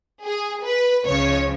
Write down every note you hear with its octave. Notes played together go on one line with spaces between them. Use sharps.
G#4
B4
C#2 C#3 F3 C#5